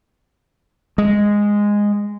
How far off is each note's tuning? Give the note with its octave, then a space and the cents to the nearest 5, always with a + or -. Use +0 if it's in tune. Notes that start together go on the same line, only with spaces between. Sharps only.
G#3 -10